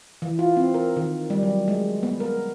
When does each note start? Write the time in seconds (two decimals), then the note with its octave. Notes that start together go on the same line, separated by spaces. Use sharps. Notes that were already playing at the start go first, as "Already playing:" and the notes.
0.22 E3
0.39 F4
0.57 C4
0.74 A#4
0.96 D#3
1.30 G3
1.43 F#3
1.68 G#3
2.03 B3
2.20 A#4